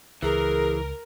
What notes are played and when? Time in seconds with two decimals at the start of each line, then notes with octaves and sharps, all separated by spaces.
0.22 C#2 E3 G#4 A#4